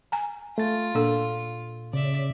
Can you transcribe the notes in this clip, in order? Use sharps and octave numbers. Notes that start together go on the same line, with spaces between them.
G#5 A#5
A3 F4 A6
A#2 D4 A4
C#3 D5 E5